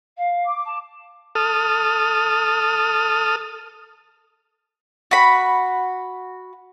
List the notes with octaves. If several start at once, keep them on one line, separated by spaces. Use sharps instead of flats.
F5
D6
A5
A4 D#6 F6
F#4 B5